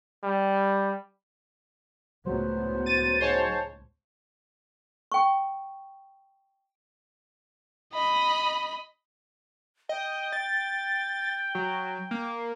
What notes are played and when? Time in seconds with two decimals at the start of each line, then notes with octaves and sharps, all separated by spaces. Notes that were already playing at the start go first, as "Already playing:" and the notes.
0.23 G3
2.26 C#2 A2 F#3 B3 C5
2.86 A6 D#7
3.21 G#2 C5 C#5 A5
5.12 G5 C#6
7.93 D#5 B5
9.89 D#5 G5
10.32 A6
11.55 F#3
12.11 A#3